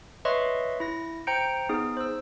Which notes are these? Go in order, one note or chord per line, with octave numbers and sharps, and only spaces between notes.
B4 C#5 D#5 E5 C6 C#6
E4 A#6
C5 G5 A#5 G6 C#7 D7
B3 D#4 G#4
C5 E6